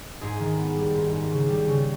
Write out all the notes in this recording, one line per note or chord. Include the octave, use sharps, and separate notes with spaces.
G#2 G#4
D#3
B3
G3
G#2
G#2
C#3
G3
C#3